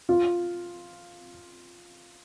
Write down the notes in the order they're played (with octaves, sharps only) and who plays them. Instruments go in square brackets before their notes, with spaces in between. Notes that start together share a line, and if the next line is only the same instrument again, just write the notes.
[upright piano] F4